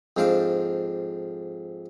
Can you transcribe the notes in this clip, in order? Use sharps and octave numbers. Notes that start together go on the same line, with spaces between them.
F2 G#2 D4 C5 D5 F5